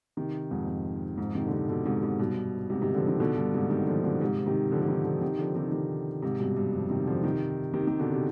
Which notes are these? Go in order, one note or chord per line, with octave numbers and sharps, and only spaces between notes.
C3 D#3
F2 G#2
F2
F2 G#2
C3 D#3
D3
C3 D#3
B2 D3
G#2 C3
G#2 C3
G2 B2
G#2 C3
C3 D#3
D3 F3
C3 D#3
B2 D3
G2 B2
G#2 C3
C3 D#3
D3 F3
B2 D3
G#2 C3
C3 D#3
D3 F3
D3
C3 D#3
D3 F3
C3 D#3
D3 F3
C3 D#3
C3 D#3
G#2 C3
G2 B2
G2
F2
C3 D#3
D3 F3
C3 D#3
C3 D#3
C3 D#3
B2 D3
C3